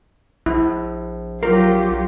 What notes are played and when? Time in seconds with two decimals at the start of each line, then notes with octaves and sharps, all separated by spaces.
0.46 A#1 E4
1.43 F#3 F4 G4 A#4